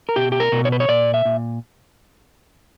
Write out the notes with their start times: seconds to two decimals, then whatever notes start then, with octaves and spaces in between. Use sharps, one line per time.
0.09 A#4
0.16 B2 G4
0.32 G4
0.40 A#4
0.52 B2
0.65 C#5
0.72 B4
0.80 C#5
0.89 A#2 D5
1.14 E5
1.25 A#2